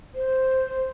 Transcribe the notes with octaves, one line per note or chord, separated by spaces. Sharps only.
C5